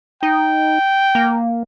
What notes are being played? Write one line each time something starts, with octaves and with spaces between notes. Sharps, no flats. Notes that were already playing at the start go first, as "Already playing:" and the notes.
D#4 G5
A#3